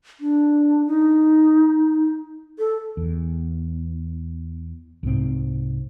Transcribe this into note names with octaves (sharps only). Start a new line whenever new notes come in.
D4
D#4
A4
E2
C2 G#2 C4